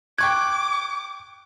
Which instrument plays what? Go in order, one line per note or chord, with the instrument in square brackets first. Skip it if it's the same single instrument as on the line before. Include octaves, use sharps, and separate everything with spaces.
[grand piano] G5 C#6 F#6 [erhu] D6 [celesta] G#6